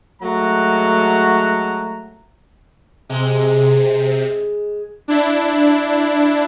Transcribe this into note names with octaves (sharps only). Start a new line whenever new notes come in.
F#3 G#3 A3 F#4 F#5 A#5
C3 G#3
D4 E4